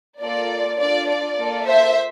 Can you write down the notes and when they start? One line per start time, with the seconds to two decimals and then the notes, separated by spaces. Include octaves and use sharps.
0.21 A#3 F4 A4 D5
0.79 D4 F4 A4 D5
1.08 D5
1.37 A#3 F4 A4
1.65 C5 E5